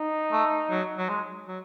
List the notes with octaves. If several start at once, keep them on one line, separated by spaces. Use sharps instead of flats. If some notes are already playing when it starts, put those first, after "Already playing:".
Already playing: D#4
A3
F#3
F#3
G#3
F#3